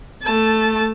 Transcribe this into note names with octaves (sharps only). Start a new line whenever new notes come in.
A3 A5